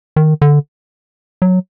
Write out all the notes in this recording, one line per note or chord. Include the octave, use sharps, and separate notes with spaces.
D#3
D3
F#3